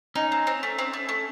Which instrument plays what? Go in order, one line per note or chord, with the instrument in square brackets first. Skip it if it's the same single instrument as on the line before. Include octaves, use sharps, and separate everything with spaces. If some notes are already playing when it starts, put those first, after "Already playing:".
[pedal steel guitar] C#4 [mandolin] D#4
[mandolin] C4
C4
A3
C4
A3
A3